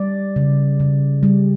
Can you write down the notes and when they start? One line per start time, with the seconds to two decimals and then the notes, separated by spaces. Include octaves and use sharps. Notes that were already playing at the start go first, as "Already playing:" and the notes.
Already playing: G3 D5
0.36 C#3
0.80 C#3
1.23 G3